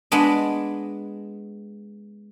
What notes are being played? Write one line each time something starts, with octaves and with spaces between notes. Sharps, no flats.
G#3 B3 D4 D#5